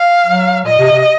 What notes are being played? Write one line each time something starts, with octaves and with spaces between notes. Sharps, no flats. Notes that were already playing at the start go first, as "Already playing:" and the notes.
Already playing: F5
F#3
A#2 D#5
C3
C3